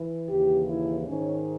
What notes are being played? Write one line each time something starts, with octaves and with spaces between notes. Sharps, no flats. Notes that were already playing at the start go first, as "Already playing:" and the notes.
Already playing: E3
D#2 C#3 E3 G4
E4
G#2 D#3 C#4